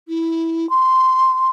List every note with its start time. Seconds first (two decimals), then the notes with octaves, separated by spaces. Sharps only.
0.08 E4
0.70 C6